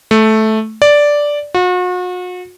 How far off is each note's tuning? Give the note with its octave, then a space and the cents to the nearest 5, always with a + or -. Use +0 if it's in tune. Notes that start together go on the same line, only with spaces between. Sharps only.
A3 -10
D5 -5
F#4 -40